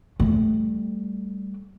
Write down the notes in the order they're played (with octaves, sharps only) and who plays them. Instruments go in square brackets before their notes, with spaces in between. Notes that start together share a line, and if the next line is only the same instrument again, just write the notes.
[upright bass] G3 A3